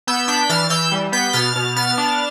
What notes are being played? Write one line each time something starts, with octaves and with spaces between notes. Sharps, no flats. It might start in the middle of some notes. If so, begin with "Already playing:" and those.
B3 E6 G6
D4 G6 B6
E3 F6 A6
E3 E6 G6
G3
B3 G6 B6
B2 F6 A6
B2
B3 F6 A6
D4